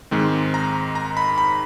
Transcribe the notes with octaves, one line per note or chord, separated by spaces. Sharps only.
G#2 D#3 G#3 C4
A#5
A#5
B5
B5